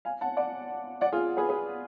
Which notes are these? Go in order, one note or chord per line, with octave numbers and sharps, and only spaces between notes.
F5 G#5
F#5 A5
D5 F#5
D5 F#5
F4 G#4
G#4 B4
G#4 B4